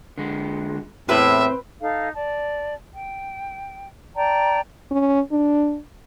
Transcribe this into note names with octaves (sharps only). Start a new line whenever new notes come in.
D3 G#3
E2 A2 C4 B4 E5 B5
D#4 A4 F5
D5 A5
G5
D5 G5 A5 A#5
C#4
D4